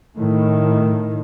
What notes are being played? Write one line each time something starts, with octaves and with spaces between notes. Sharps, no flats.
A2 D#3